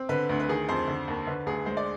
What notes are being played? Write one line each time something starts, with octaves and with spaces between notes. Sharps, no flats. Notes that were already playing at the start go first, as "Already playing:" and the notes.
Already playing: C4
D3 B4
D2
B4
D#3 G#4
F2 C5
D3
D#2
D3 B4
D2 G#4
G#3 C5
D5